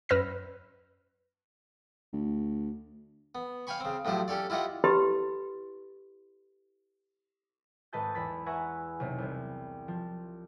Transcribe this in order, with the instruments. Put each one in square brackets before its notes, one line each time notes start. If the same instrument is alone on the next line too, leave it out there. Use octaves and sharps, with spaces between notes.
[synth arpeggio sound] F#2 B4 E6 F6 A#6
[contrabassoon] D2
[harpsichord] B3
C#5 F5 G5 G#5 B5 C#6
C#3 C4
A2 F3 F#3 G4 C5
C#4 G4 A4 C#5 D5
E4 F4 G4 D#5 F#5
[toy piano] E4 G4 A4 B4 B5 C6
[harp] G#1 A4 B4 D#5 A5 G6
E2 B5 A6
B4 E5 F#5 G#5 A#5 C#6
B1 C3
C2 C3
F3